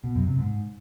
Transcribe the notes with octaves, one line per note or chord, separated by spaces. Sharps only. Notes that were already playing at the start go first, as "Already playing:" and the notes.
B2
F#2
C3
G#2